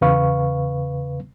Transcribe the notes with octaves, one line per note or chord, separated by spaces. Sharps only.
E2 C#3 B4 F5 C#6